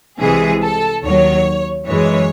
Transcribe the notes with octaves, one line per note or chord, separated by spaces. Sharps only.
C2 C3 E3 G#3 G#4
A4
D#2 D#3 F#3 C#5
F#2 E3 G#3 C#5